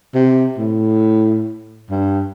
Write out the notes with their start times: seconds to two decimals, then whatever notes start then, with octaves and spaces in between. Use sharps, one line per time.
0.14 C3
0.58 A2
1.90 G2